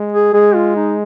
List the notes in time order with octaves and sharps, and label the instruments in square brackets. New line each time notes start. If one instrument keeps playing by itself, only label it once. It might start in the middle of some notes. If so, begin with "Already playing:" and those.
Already playing: [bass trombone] G#3
[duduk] G#4
[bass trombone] G#3 [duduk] G#4
[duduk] F4
D#4